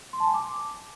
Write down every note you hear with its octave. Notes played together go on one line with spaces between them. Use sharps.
C6
A5
G#5
D6